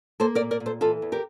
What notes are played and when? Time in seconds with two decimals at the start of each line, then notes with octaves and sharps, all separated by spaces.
0.20 A#3 A4 C5
0.35 A#4 D5
0.41 A#2
0.51 A#4 D5
0.60 A#2
0.66 A4 C5
0.81 E3 F4 A4
1.02 E2
1.12 G4 A#4